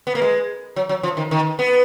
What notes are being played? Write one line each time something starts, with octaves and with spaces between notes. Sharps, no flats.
B3
A#3
G#3
F#3
F#3
F3
D#3
D#3
B3